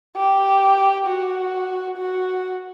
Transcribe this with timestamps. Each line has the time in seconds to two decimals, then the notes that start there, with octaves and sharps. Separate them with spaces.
0.16 G4
1.07 F#4
1.97 F#4